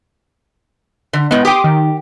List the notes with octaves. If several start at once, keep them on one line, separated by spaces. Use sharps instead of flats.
D3
A2 G#3 B3
G4 G5 C6 D6 D#6
D#3